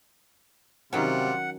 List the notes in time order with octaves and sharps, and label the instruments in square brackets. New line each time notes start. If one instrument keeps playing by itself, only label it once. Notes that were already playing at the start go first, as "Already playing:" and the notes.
[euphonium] C3 [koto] D#3 F#3 C#4 [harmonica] G3 F4 [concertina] F#5